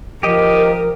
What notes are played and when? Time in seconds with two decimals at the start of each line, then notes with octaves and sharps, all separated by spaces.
0.23 F3 G4 A#4 D#5